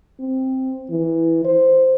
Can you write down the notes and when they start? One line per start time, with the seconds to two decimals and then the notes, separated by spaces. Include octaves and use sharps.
0.20 C4
0.90 E3
1.45 C5